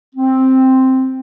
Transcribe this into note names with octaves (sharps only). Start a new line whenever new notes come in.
C4